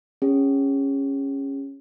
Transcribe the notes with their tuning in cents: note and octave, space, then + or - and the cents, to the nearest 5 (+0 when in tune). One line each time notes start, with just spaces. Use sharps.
C#4 -10 G#4 -35